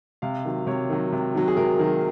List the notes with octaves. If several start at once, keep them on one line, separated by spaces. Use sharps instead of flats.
C3 F5
D#3 F#3
C3 C#5
D#3 F#3
C3
D#3 F#3
G#4
C3 A#4
D#3 F#3